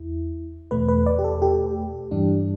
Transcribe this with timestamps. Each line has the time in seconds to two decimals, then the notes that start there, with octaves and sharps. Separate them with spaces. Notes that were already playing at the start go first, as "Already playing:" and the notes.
Already playing: E2 E4
0.71 E2 B2 A3 B4
0.88 B4
1.06 D5
1.19 G4
1.24 A4
1.42 G4
2.11 G2 E3 G3 D4